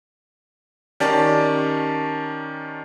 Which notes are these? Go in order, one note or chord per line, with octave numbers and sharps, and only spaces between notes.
D#3 C#4 G4 D5 A5